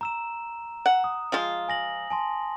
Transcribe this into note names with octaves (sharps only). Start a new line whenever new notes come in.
A#5 E6 E7
F#5
D#6
F3 G#3 F4
G#5 A#6 F#7
G#5 A5 C6